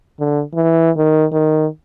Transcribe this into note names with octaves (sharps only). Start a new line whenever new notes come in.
D3
E3
D#3
D#3